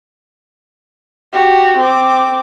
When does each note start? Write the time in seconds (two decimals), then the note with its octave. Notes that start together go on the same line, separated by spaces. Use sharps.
1.32 F#4 G4
1.78 C4 D6